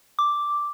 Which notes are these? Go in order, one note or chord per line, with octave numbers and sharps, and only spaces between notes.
D6